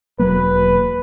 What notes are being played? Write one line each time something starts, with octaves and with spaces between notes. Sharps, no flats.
E1 F#3 A#3 B4